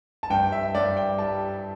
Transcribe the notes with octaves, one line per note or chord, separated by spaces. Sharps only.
A5
G2 G5
E5
G2 D5
G5
G3 A5